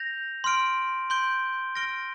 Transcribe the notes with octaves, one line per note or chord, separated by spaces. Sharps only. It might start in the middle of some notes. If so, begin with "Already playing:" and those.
Already playing: G6 A#6 F7
C6 F6 D7
C6 G6 D7 G7
F6 A#6 D7 G7